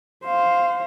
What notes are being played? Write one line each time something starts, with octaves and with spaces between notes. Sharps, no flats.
C5 F5